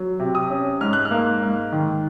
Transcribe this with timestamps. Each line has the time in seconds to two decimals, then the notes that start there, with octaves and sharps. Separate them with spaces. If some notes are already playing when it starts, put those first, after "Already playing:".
Already playing: F#3
0.19 C3
0.35 D#6
0.50 C#4
0.81 G#2 F6
0.93 F#6
1.05 F6
1.11 A#3
1.42 G#2
1.72 D#3